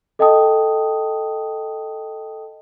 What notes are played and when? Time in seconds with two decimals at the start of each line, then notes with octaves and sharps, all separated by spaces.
0.19 A4 D#5 G5 A5 D#6